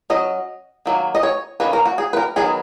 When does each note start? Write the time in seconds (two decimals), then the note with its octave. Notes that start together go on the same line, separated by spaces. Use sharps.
0.10 F#3 C#4 D#5
0.86 D#3 F#3 A#3
1.15 D#5
1.23 C#5
1.60 D#3 A#3 C#4 B4
1.73 A#4
1.86 F#4
1.98 G#4
2.13 B4
2.17 A#4
2.36 D#3 F#3 B3 D#4 G#4